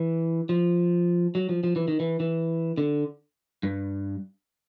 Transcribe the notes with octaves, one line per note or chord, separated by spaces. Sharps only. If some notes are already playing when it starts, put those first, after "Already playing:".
Already playing: E3
F3
F#3
F3
F3
E3
D#3
E3
E3
D3
G2